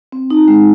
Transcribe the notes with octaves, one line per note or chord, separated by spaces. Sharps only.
C4
D#4
G#3